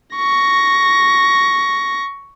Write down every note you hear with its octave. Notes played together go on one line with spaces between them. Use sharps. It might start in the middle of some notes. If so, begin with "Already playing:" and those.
C#6 A#6